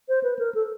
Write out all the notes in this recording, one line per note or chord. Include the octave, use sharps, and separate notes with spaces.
C5
B4
A#4
A4